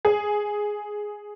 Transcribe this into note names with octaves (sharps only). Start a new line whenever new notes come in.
G#4